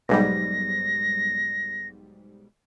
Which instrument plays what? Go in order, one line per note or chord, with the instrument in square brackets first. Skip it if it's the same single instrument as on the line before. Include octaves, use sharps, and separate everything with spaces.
[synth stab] B1 G#2 G3 [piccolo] A#6